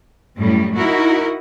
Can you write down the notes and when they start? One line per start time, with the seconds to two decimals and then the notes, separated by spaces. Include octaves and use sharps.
0.36 F#2 A2 G3
0.77 D#4 E4 F#4 A#4